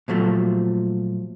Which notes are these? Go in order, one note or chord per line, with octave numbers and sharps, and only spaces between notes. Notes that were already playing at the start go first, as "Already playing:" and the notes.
A#2 F3 F#3 A3